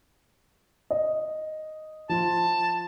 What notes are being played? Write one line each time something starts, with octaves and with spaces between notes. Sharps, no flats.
D#5
F3 F4 A5